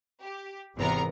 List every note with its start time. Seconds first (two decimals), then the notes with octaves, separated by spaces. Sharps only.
0.21 G4
0.76 G#1 E2 C3 B3 A#4 A#5